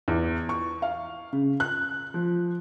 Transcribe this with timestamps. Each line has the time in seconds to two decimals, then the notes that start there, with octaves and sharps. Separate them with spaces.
0.08 E2
0.49 C#6
0.82 F5
1.33 C#3
1.60 F#6
2.14 F3